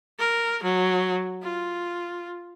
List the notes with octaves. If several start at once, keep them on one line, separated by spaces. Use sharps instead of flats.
A#4
F#3
F4